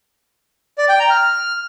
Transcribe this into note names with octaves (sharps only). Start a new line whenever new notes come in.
D5
G5
A#5
F6